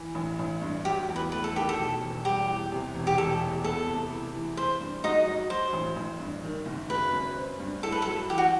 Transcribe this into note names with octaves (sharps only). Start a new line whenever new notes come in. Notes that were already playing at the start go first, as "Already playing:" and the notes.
Already playing: E3
A1
A1
G2
F#3 G4
E2
B4
A3 B4
A4
D#3 G4
A4
B2
E1
G3 G4
E2
C3
E1
G4
E1 A4
E2
B3 A4
C3
E4
E3
C4 C5
G2
D#4 F#4 D#5
F#3
F#3 C5
A1
A1
G2
D#3
F#1
F#3 B4
F#2
C4
G2
E4 A4
B4
A4
F#3
E3 G4
F#4